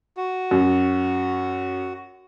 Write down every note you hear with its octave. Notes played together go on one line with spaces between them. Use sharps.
F#4
F#2